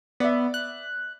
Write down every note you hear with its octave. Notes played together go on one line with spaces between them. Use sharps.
B3 D5 E5
F#6